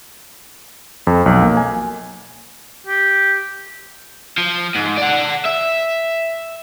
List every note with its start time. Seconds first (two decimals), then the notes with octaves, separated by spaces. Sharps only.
1.07 F2
1.26 B1
1.43 A#3
1.57 G#5
2.87 G4
4.38 F3
4.75 G#2
4.97 D5 F#5
5.45 E5